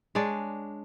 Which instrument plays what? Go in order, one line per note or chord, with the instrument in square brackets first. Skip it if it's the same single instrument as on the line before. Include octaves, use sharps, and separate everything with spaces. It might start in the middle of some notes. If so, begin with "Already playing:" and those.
[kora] G#3 D4 C#5 D5